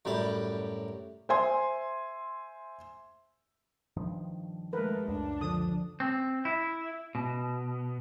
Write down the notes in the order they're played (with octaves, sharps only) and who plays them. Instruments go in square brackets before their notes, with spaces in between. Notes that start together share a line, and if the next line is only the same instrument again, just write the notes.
[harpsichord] F#2 A2 G3 D6
[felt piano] C5 E5 G#5 C6
[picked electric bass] G2 D#3 F3
[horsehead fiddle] G#3 A3 [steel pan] A#4 B4
[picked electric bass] C#2 F#2 [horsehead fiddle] D4
[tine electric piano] D3 F3 [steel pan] D#6
[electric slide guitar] C4
E4
B2